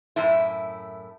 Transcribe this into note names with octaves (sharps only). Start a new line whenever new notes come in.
F#2 A2 E4